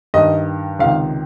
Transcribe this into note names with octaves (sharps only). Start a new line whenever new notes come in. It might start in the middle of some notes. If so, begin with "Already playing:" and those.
G2 D#3 D#5
C#2 C3 D#3 F5